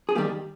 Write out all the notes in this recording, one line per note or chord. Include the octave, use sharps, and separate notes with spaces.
G#4
D#2 D#3 G3 A#3 G4